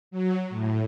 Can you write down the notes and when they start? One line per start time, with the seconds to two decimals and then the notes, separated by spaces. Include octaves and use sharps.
0.11 F#3
0.50 A2